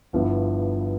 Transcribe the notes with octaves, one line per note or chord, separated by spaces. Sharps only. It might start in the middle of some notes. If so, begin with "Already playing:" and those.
G1 G2 F3 B3 E4